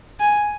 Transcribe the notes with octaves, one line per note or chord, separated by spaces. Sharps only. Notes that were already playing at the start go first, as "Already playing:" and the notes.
G#5